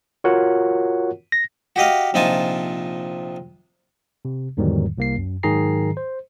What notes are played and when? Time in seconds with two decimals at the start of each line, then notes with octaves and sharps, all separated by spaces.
0.24 F4 F#4 A#4 C#5 F#5
1.32 A#6
1.76 F#4 G4 D#5 F5
2.14 A#1 C3 D#4 F4 G#5 A5
4.25 C3
4.57 E2 G#2 D3 D#3 F#3 G3
4.98 C2 A#3 C7
5.17 F#2
5.43 G#2 D#3 F#3 G#4 A#5 C7
5.97 C5